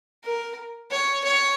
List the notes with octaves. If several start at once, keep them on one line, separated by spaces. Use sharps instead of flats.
A#4
C#5
C#5